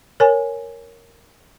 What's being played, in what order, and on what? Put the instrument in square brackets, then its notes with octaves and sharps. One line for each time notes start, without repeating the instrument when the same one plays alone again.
[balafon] A#4 C#5 G#5